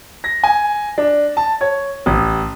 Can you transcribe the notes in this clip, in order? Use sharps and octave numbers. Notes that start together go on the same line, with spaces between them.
A#6
G#5
D4
A5
C#5
A1